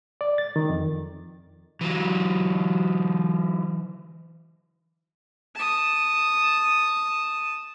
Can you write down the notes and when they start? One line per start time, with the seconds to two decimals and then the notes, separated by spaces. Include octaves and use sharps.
0.21 D5
0.38 A6
0.56 D#3
0.70 F2
1.81 E3 F#3
5.55 A5 D#6